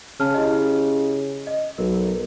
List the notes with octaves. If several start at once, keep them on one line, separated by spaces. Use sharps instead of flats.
C#3 A5 F6
E4 G4 D#5
D#5
B1 A#4